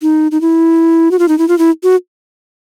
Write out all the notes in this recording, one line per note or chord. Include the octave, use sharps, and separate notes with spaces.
D#4
D#4
E4
F#4
F4
D#4
E4
F4
E4
F#4